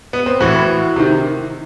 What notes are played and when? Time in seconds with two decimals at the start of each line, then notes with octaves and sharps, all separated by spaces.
0.13 B3
0.26 C4
0.40 A2 E3 F#4
0.96 C3 D#3